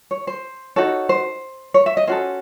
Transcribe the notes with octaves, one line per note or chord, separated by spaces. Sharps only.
C#5
C5
D#4 F#4 A4 C#5
C5
C#5
E5
D#5
C#4 F#4 A4 C5